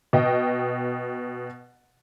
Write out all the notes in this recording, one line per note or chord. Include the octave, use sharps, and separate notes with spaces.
B2 D#5 G5